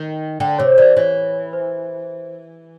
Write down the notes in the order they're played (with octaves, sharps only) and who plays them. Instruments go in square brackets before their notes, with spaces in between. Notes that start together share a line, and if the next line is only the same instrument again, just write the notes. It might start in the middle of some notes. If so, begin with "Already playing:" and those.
Already playing: [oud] D#3
[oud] D3 [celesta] G5
[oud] C3 [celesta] C#5
[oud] E3 [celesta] D5
[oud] E3 [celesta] C#5
[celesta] C5